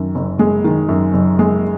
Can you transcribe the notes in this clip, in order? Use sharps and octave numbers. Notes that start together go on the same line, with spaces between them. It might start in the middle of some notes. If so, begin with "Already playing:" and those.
Already playing: F#2 D#3
F#1
G#3
D#3
F#2
F#1
G#3